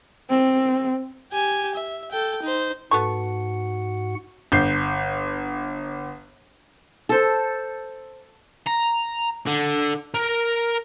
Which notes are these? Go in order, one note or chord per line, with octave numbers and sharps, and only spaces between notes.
C4
G4 G#5
E5
A4 G5
D#4 C5
G#2 B3 F#4 A4 F#5 C#6
G1 G6 C7
A4 C5
A#5
D3
A#4